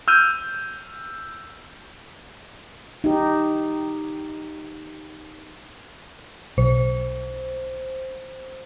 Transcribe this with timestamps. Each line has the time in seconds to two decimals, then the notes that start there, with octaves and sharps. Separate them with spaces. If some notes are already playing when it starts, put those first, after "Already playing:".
0.08 E6 F6 G6 D#7
3.04 D#4 G4
6.58 B1 C5